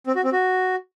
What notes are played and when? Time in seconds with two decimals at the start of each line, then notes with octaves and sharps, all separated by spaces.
0.07 C4
0.15 F#4
0.24 C4
0.32 F#4